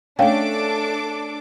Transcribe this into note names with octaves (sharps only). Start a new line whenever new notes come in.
A3 C#4 D4 A4 F5 G5 D6